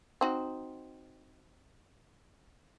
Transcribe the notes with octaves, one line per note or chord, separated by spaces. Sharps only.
C4 D#4 F#4